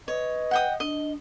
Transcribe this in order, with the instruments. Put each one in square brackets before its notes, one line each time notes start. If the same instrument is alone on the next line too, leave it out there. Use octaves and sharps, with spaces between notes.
[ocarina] B4 [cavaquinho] C#5 [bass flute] D#5
[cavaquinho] F#5 G5 D#6
[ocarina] D4 [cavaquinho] D#5